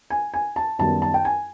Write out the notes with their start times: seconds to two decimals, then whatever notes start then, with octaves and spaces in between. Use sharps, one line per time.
0.10 G#5
0.34 G#5
0.56 A5
0.79 F#2 D#3 G3 B3 A5
1.02 A5
1.14 G5
1.25 G#5